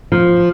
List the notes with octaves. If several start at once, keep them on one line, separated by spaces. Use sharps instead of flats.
F3